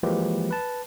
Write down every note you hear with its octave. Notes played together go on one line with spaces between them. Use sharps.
E3 F3 G#3 A#3 G4 B4
B4 A5